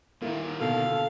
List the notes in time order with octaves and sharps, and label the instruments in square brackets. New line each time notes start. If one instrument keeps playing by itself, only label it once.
[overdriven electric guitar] A#2 D#3 [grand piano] A#3 E4
[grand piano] B2 D3 [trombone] A4 [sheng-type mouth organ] F5